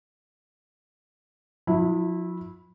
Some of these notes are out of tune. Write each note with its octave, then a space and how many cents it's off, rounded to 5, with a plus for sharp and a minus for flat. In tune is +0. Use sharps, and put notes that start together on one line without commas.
F3 +40 E4 -15